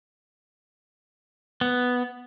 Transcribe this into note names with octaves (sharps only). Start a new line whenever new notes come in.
B3